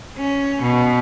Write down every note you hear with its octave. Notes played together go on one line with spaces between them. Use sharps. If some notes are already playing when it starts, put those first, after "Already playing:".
C#4
B2